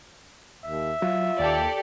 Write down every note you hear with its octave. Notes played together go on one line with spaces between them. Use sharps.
D#2 E5
F#3 F4
D#2 G4 A4 D5